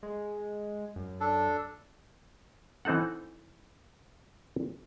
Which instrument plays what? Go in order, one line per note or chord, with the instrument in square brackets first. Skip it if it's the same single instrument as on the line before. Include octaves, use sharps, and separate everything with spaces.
[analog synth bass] G#3
F#2
[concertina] D4 A4
[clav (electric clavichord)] E3 C4 D#4 A4 F#5